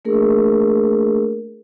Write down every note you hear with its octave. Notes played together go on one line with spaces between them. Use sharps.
A3 A#3 D4 G#4 A#4